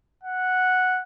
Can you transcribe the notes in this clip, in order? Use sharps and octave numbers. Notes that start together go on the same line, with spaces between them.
F#5